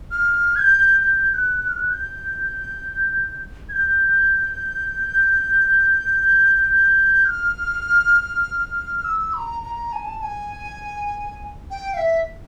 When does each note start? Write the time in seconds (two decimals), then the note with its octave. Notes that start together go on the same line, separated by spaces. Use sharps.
0.11 F6
0.56 G#6
0.61 G6
1.01 G6
1.30 G6
1.34 F#6
1.60 F#6
1.69 F6
1.76 F#6
1.90 G6
3.69 G#6
3.73 G6
7.25 F6
9.04 E6
9.34 B5
9.38 A#5
9.63 A#5
9.93 G#5
10.05 A5
10.18 A5
10.23 G#5
11.71 G5
11.94 F5
11.97 E5